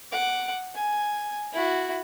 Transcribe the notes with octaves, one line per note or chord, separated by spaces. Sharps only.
F#5 D6
G#5
E4 F#4